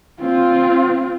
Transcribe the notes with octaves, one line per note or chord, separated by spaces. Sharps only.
C4 F4